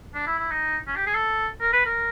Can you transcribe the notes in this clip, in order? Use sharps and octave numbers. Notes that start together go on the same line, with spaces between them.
D4
E4
E4
D#4
C#4
G4
G#4
A4
A#4
B4
A#4